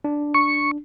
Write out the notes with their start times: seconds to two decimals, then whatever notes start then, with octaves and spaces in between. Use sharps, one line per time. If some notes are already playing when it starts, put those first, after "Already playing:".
0.04 D4
0.34 C#6